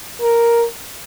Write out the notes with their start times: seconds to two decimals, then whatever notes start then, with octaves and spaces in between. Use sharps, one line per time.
0.22 A#4